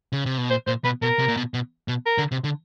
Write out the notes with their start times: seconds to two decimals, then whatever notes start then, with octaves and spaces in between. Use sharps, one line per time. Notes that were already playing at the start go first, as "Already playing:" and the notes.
0.13 C#3
0.26 C3
0.38 B2
0.50 A#2 C5
0.67 A#2 C5
0.84 B2 B4
1.02 B2 A#4
1.19 C3
1.28 A#2
1.37 B2
1.54 B2
1.88 B2
2.06 A#4
2.18 D3
2.32 C3
2.44 D3